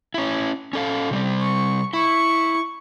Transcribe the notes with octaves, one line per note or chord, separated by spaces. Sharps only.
C#4 E4
C#4 A4 F5
C3 G3 C4
C#6
E4 C#6